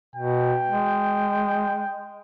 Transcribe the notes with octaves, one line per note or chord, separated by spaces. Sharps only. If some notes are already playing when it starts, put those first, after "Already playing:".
B2 G5
G#3